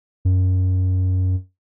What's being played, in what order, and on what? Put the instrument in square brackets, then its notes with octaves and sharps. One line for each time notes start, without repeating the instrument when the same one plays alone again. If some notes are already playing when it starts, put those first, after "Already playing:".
[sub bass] F#2